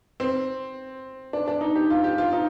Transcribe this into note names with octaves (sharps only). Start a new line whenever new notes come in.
C4
D4
D4
D#4
G4
F4
G4
F4
D#4